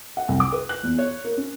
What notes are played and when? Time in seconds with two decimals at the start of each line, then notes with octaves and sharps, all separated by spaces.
0.17 F#5
0.28 C2
0.40 D6
0.52 B4
0.69 F#6
0.83 E2
0.98 C#5
1.24 A#3
1.37 C#4